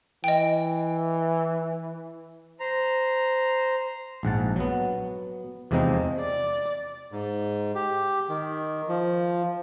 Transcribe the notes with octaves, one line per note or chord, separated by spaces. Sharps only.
E3 D#5 G5
C5 A#5
A#1 G#2 F#5 A5
F#3 B3
E2 C3 F3 G#3 C4 D#4
D5
G#2
G4
D#3
F3